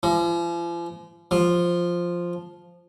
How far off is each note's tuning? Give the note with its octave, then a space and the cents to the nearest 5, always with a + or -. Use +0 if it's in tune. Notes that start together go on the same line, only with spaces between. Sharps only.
F3 -40
F3 +0